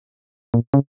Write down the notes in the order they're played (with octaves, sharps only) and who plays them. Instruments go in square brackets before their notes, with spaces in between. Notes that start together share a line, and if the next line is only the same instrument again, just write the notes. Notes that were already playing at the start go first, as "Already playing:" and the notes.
[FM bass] A#2
C#3